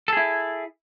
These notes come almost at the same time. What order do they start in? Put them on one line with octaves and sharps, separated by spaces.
A4 G#4 E4